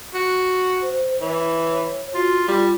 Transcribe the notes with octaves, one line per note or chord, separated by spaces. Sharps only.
F#4
C5
E3 C#5
F4 F#4
G3 F4